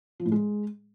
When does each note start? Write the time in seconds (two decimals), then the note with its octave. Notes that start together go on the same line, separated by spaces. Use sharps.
0.20 F3
0.26 A2
0.32 G#3